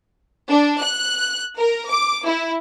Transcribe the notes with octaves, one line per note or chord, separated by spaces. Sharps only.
D4
F#6
A#4
D6
E4